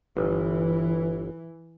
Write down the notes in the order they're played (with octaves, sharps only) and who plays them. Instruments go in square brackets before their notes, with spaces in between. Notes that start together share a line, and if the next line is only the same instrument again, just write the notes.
[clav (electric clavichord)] G1 [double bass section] E3